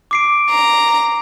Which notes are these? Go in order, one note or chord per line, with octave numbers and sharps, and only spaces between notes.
D6 C7 D7
A#5